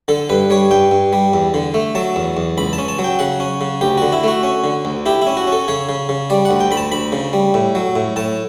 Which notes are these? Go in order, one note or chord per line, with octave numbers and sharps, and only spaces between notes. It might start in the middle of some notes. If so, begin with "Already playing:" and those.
D3 A4
G2 B4
G3 C#5
G2 G5
G2
G3
E2
D3
A3
F#3 A5
E2
E2
C#2 B5
A5
C#4
A5
F#3
G5
C#3 F#5
C#4
C#3
D2 G4
D3 F#4
E4
A3 F#4
C#4
D3
D2
E4 G4
E4
C#4
F#4
C#4
A4
C#3 C#5
C#3
C#3
G3 D5
F#5
D2
G5
D2 B5
A5
D2 B5
C#3
G3
A2
F#3
A2
A2 A5